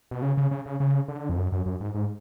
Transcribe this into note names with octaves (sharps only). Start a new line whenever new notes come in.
B2
C#3
C#3
C#3
C#3
C#3
D3
F2
F#2
F#2
F#2
G#2
G#2